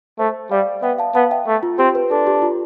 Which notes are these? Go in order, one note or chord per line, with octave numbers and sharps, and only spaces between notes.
A3 C5 E5
G3 D5 F5
B3 E5 G5
F5 A5
B3 F5 A5
E5 G5
A3
F4
C4 G4
B4
D4 A4
G4
F4